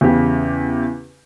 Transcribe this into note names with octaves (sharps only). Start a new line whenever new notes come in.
E2 C#3 G4